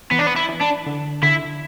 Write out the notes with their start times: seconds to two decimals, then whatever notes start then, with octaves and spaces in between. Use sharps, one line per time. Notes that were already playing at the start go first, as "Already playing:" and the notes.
0.11 E3 B3
0.19 D4
0.27 B3
0.36 E4
0.49 E3
0.61 D4
0.86 D3
1.22 D3 E4